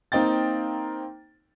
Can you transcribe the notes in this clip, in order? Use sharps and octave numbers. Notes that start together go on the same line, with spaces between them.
A#3 C4 D#4 G5 A6